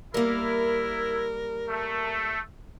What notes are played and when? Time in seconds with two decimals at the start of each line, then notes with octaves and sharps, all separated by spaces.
0.14 G3 A#3 E4 A#4
1.69 A3